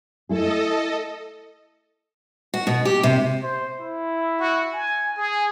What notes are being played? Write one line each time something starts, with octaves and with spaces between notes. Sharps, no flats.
A3 E4 G#4 A4 D#5
F#4
B2
G4
C3
C5
E4
F#4
G#5
G#4 G#5